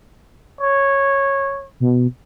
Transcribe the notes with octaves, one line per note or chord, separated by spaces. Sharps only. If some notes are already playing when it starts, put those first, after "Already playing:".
C#5
B2